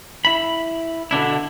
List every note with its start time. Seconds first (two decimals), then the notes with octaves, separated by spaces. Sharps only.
0.25 E4 B5
1.11 B2 D3 D4 E4